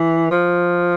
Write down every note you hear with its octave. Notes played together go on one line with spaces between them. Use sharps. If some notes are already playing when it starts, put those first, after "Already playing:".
Already playing: E3
F3